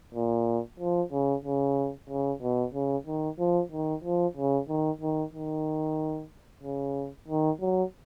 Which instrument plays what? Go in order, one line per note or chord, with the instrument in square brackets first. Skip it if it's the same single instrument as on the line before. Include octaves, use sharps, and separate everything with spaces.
[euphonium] A#2
F3
C#3
C#3
C#3
B2
C#3
D#3
F3
D#3
F3
C#3
D#3
D#3
D#3
C#3
D#3
F#3